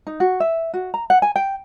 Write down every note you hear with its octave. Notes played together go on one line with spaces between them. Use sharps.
D#4
F#4
E5
F#4
A#5
F#5
G#5
G5